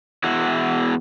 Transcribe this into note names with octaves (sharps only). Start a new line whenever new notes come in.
E2 E4 F#4